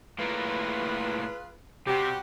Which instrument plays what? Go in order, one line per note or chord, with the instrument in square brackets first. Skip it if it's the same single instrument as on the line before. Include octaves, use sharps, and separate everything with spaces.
[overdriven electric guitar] A2 A#3 [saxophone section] F4 G#4 B4
[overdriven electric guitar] C3 [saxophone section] G3 F#4 G4